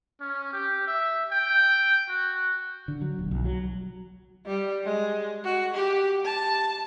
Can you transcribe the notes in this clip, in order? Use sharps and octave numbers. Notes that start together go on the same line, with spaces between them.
C#4
G4
E5
G5
F#4
D3
F#3
D#1
B1
F#3
G3
G#3
F#4
G4
A5